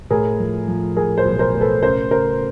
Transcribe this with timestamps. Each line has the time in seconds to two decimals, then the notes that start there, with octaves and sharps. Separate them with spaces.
0.10 A2 G#4 A#4
0.39 F3
0.67 F3
0.96 F3 G#4 A#4
1.18 A#4 C5
1.25 B1
1.39 A#4 C5
1.54 A2
1.61 A4 B4
1.83 C#3 A#4 C5
2.11 C#3 A#4 C5